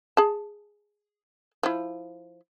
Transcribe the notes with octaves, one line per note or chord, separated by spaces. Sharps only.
G#4 A5
F3 E4